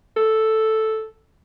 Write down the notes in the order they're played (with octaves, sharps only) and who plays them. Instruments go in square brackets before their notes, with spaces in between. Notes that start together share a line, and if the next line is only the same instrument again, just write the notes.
[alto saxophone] A4